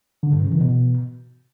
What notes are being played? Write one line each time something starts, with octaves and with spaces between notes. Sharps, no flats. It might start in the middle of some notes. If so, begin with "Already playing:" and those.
D3
G2
C#3
E3
B2